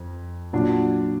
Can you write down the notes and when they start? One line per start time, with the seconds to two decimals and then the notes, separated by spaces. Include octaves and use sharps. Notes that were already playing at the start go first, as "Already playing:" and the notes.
Already playing: F2
0.53 A#2 F#3 D4 F4